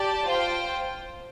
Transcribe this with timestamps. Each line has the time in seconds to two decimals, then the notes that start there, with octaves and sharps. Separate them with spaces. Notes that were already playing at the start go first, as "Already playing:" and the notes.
Already playing: G4 D5 A5
0.27 F4 C5 G5